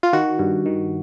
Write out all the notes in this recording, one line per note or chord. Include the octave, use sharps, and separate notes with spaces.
F4
D#3 F#4
G2
D#3